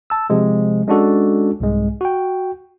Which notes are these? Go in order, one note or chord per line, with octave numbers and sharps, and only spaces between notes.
A5 E6
C3 F3 G#3
G#3 C#4 D4 F#4 A4
C2 G#2 G#3
F#4 G5